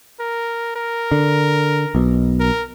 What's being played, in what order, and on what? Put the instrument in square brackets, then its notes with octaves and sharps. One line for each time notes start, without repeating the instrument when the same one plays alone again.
[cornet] A#4
A#4
[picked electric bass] D3
B1 B2
[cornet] A#4